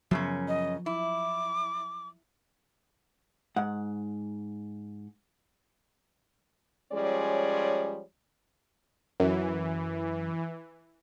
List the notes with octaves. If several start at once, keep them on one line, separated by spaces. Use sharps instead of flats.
F#2 C#3 F3 F#3 B3 C#4
D#5
E4 D6
G#2 F#5
F3 G3 G#3 C#4 C#5 D5
F#2 E3